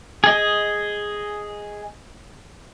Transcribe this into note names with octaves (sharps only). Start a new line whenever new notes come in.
G#4 D#5